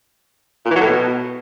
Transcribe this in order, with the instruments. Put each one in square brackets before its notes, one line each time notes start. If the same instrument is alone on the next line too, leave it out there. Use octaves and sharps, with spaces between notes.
[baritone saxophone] A#2
E3
F#3
A2
B2